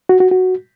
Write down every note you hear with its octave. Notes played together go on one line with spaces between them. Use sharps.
F#4
F#4
F#4